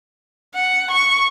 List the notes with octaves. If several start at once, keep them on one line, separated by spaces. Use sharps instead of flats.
F#5
C#6